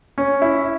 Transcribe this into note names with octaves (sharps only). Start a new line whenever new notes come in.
C#4
E4